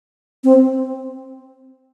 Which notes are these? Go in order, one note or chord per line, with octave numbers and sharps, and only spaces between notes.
C4